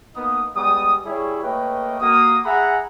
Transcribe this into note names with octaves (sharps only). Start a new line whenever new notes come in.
A#3 B3 D#4 D#6
G3 G#3 B3 D#6
G3 E4 G#4 C#5
A3 A#3 B4 C#5 D#5 G5
A#3 F#4 D#6
G#4 E5 F#5 G#5 A#5 B5